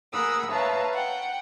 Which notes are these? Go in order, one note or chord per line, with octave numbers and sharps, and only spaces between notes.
G#4 A#4 F#5 B5 D#6 E6
B4 C#5 E5 F5 A5 A#5
F#5 G5